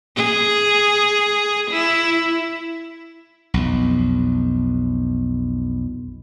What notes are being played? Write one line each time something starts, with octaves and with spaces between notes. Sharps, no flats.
G#4
E4
B1 F2